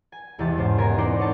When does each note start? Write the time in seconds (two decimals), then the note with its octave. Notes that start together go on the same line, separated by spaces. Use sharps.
0.12 G#5
0.39 E1 E2 C3 G4 A5
0.57 G#2 C#3 C#4 C5
0.78 B2 B3 A#4 G#5 A#6
0.98 C4 D#4 A#4 C5 D5 F#5
1.19 C#5 D#5 A5